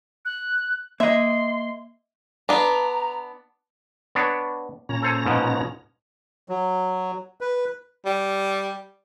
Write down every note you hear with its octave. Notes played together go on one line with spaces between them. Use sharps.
F#6
A#3 D#5 E5 C6
B3 D4 A#5
B3 D4 C#5
A#2 C#4 A#5
A4 C5 G#5
G#2 B2 F3
F#3
B4
G3